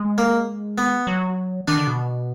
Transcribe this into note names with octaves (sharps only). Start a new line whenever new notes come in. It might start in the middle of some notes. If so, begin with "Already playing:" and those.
Already playing: G#3
A#3
B3
F#3
D#3 D4
D3
B2